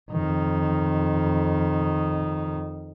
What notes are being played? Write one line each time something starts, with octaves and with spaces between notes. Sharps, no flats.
F2 D#3